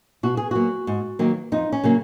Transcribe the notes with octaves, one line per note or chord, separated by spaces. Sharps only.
B2 F#4
G#4
F#3 A#3 F#4
G#2
D#3 F#3 A#3
F2 D#4
C#4
C#3 F#3 A#3